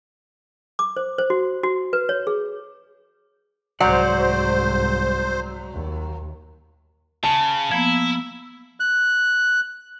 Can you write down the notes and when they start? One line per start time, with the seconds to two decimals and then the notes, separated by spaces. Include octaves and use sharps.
0.79 D6
0.97 C5
1.18 C5
1.30 F#4
1.63 F#4
1.93 B4
2.09 C#5
2.27 G#4
3.80 C2 G#2 F#3 C5 D5 F#5
5.73 D#2
7.24 C#3 A5
7.72 F3 A#3 B3 E4
8.80 F#6